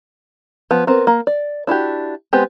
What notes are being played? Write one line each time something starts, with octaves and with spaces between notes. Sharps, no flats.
F3 B3
B3 C4 A#4
A#3
D5
D4 E4 F#4 G4
G#3 B3 C4 G4